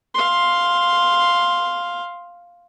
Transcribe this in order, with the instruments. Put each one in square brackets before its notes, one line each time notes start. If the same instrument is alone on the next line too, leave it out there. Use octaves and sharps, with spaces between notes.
[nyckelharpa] F5 C6